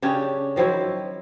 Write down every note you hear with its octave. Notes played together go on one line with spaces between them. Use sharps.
C#3 C#4 D4 G4
D#3 F3 F#3 E4